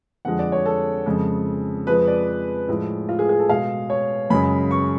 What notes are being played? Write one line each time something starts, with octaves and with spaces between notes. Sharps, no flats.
F2 D3 F3 G#3 F#5
D5
C#5
A4
F2 C#3 G#3
F2 F3 G#3 B4
D5
A2 F3 G#3
F4
G#4
G#4
A4
B2 G#3 F5
C#5
F#2 C#3 G#3 B5
C#6